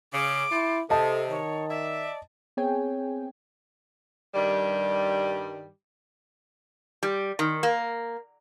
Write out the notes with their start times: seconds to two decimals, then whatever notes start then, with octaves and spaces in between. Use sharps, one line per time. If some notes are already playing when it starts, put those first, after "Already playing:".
0.13 C#3 D6
0.52 E4 G5 A5 C6
0.90 C3 A4 D#5 A5 D#6
1.30 D#3 C#5
1.69 D5 E5
2.57 B3 C4 G#4 C#5 G5 G#5
4.35 G2 D#3 G3
7.03 G3
7.39 D#3
7.63 A#3